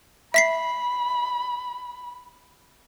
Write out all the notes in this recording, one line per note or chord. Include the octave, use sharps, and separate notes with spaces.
E5 B5 B6 C7